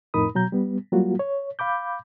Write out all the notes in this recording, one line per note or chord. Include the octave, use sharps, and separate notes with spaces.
F2 A2 D#4 A#4 B5 D#6
B2 F#3 A#5 G6
G3 B3
F#3 G3 A#3 F4 F#4
C#5
F5 B5 D6 G6